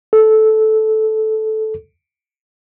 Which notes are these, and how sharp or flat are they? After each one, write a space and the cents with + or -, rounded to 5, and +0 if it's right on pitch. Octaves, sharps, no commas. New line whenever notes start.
A4 -10